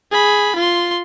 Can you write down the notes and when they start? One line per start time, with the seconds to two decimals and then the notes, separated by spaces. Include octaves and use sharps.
0.11 G#4 B5
0.55 F4 C6